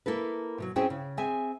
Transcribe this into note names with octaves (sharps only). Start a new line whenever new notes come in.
A#3 E4 A4 B4
B2 F3 F#3
C4 C#4 E4 G#4 C5 G5
C#3
C4 G#4 E5 G#5